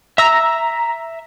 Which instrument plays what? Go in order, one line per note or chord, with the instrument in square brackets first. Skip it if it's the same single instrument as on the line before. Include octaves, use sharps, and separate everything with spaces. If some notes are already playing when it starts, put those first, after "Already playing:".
[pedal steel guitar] E5 E6 [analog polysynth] A#5